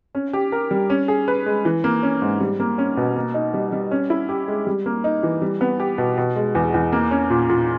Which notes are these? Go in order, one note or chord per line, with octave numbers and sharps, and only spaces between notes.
C#4
G4
A#4
G3
C#4
G#4
B4
G#3
E3
A#3
C#4
G#2
G3
A#3
C#4
B2
A#3
D#4
G3
G3
C#4
E4
G4
G#3
G3
A#3
D#4
E3
G3
B3
G4
B2
B2
G#3
E2
E2
A#3
C#4
A#2
A#2